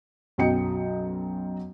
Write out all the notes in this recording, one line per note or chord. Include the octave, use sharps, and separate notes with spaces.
B1 F#2 F#3 D#5 G5 C#7